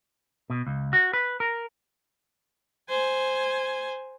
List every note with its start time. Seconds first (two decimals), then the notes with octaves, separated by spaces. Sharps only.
0.50 B2
0.67 C#2
0.93 F#4
1.13 B4
1.40 A#4
2.90 C5 G#5